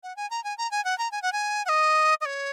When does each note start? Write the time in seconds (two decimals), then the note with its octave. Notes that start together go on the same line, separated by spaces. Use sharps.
0.03 F#5
0.16 G#5
0.30 A#5
0.44 G#5
0.58 A#5
0.71 G#5
0.85 F#5
0.98 A#5
1.12 G#5
1.22 F#5
1.32 G#5
1.66 F#5
1.69 D#5
2.21 D#5
2.25 C#5